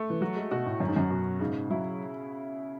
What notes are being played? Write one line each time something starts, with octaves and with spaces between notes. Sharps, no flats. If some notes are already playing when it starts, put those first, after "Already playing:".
Already playing: A3
E3
F#3 F#4
G#3
B2 F#4
A2
F#2 C#4
G#2
F#2
B2
G#2 C#3
F#3 E4